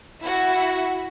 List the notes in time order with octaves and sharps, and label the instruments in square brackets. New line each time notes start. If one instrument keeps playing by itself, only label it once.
[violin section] E4 F#4